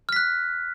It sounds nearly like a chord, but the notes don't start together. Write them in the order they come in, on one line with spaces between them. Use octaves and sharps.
F6 B6 F#6